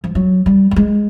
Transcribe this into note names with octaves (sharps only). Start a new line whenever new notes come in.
F3
F#3
G3
G3
G#3